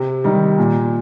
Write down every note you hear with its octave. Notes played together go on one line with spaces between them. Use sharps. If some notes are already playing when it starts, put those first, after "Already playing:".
Already playing: C3
D#3 G3
A#2